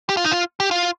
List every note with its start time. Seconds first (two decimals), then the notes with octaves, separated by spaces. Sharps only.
0.09 G4
0.17 F4
0.25 D#4
0.32 F4
0.60 G4
0.71 F4